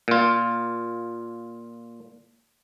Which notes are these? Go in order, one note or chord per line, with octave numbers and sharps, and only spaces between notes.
A#2 F4